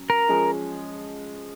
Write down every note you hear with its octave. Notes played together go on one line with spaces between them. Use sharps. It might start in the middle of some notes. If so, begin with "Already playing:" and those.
Already playing: F#3 C#4
A#4
F3 G#3 C#4 G#4